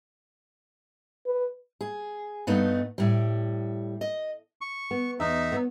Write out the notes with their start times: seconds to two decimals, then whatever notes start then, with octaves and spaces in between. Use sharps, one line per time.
1.27 B4
1.81 G#4
2.47 G2 A3 B3 D#4
2.98 A2 G3
4.01 D#5
4.61 C#6
4.91 B3
5.20 E2 D#4 E5
5.52 B3 C#5